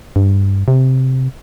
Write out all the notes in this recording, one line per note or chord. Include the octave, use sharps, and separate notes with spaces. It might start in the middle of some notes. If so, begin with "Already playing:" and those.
G2
C3